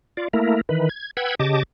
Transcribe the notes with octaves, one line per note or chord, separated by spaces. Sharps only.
F4 D5
A3 A#3 E4 A#4
D#3 E3 B4
G#6
B4 F#5 G5 E6 G#6
C#3 G4 D#5 A5 D6